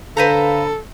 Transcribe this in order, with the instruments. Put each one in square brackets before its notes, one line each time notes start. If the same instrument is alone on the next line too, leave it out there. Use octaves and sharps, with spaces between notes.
[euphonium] D3 [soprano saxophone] A4 [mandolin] B4 C5 A#5 [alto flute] F5